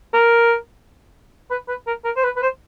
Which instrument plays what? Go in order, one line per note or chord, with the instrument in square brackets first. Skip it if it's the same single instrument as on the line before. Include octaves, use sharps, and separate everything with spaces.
[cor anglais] A#4
B4
B4
A#4
A#4
C5
B4
B4
C5